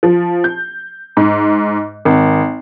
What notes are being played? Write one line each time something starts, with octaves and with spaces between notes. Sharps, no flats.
F3
G6
G#2
G#1